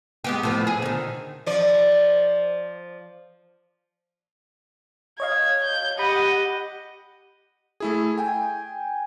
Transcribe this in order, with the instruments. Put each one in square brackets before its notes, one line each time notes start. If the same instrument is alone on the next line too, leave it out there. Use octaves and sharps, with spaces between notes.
[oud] G#3 B3 G4
A2 F3 B3
G#4
D3 D#3
[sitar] F3 D5
[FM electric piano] C#5 D#5 F5 [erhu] G#6
[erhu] G6
[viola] G4 D#5 [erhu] F#5 [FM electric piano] B5
[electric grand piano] A3 E4 G#4
G5 G#5